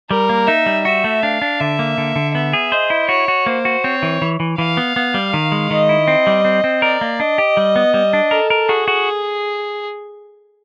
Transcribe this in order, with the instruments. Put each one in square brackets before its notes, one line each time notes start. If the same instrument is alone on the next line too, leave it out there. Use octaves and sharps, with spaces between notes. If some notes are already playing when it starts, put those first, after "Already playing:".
[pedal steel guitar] G3 [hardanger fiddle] A#4
[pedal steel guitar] A#3
[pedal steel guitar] D#4 [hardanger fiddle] E5
[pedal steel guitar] G3
[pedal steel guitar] F#4 [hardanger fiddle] E5
[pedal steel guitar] A3
[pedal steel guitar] D4 [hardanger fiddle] F5
[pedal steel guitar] D4
[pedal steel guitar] D3 [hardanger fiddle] E5
[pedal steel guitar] A#3
D3
D3
[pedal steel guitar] B3 [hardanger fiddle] E5
[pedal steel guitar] G#4
[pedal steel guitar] C5 [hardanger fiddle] D#5
[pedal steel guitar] E4
[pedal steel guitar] F#4 [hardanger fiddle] C#5
[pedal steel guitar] F#4
[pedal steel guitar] A#3 [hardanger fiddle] C5
[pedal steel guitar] F#4
[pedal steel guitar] C4 [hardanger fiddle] C#5
[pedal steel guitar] E3
E3
E3
[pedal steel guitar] E3 [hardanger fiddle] F5
[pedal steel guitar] B3
B3
G3
D#3
G#3
[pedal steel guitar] D#3 [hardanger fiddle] D#5
[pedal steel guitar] E4
C4
G3
C4
C4
[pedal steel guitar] A#4 [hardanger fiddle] D5
[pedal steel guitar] A#3
[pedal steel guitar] D4 [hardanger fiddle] D#5
[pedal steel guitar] G4
G3
B3
G3
D4
[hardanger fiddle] A4 [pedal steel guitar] A#4
[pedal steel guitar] A#4
[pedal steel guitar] F#4 [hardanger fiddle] G#4
[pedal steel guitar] F#4